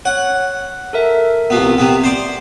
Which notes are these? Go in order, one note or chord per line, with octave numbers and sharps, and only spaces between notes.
C#5 F#5
A4 A#4 E5
C2 F3 B3
C3 B3
C5 D5